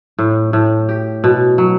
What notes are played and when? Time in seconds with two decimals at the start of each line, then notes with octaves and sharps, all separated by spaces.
0.19 A2
0.53 A2
0.89 G4
1.24 B2
1.58 F#3